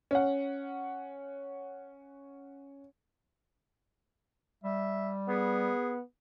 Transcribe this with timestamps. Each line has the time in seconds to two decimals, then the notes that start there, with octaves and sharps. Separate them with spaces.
0.11 C#4 F#5
4.64 G3 E5
5.29 B3 G#4